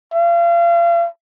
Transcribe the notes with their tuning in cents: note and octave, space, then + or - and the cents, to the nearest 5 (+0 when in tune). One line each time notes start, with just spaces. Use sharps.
F5 -35